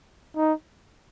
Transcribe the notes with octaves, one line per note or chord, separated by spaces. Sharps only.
D#4